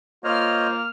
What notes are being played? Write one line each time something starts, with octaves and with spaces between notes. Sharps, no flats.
A#3 F4 C5 C#5 D#5 F6